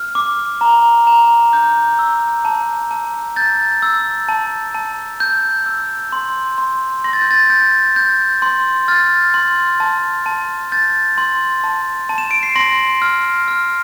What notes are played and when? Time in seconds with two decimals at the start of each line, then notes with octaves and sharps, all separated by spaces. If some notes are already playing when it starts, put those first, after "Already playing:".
Already playing: F6
0.15 D6
0.61 A#5
1.07 A#5
1.53 G6
1.99 E6
2.45 A5
2.91 A5
3.36 G6 A6
3.83 E6
4.29 A5
4.75 A5
5.20 G6
5.66 E6
6.12 C6
6.58 C6
7.04 C6 A#6
7.13 A6
7.22 G6
7.31 A6
7.50 G6
7.96 G6
8.42 C6
8.88 F6 A6
9.34 C6
9.80 A5
10.26 A5
10.72 G6 A6
11.18 C6
11.64 A5
12.09 A5
12.18 E7
12.31 D7
12.43 C7
12.56 C6 A#6
13.02 F6
13.48 F6